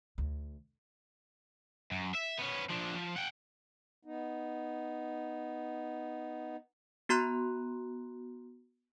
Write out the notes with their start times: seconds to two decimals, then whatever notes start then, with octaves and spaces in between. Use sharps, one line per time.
0.18 D2
1.91 F#2
2.14 E5
2.38 B3 C#4
2.70 F3 D4
2.95 F3
3.16 F#5 G5
4.05 B3 D#4
7.09 B3 F#4 A#5 C6 F#6